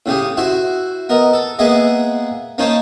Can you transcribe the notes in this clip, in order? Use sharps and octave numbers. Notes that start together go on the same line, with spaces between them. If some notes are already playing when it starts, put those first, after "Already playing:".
A2 C#3 G4 D#6
E4 F#4 C5
B3 A#4 D#5
A4
G#3 A#3 B3 G#4 D#5 E5
A#3 C#4 D#4 C5 C#5 A5